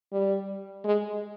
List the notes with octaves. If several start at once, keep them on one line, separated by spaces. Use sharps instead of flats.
G3
G#3